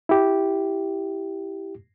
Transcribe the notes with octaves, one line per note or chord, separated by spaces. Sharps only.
E4 G4